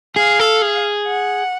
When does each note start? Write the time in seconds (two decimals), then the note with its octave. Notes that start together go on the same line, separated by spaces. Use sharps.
0.16 G#4 F5
0.40 A4
0.62 G#4
1.07 F#5